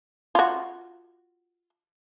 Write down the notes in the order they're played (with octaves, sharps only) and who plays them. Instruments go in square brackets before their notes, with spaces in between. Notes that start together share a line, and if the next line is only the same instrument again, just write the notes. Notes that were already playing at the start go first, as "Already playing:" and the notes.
[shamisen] F4 F#4